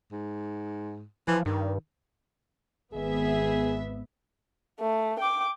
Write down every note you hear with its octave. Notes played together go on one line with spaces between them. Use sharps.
G#2
E3 F3
G2 D#3
G#1 B3 G#4 E5
A3
G5 D6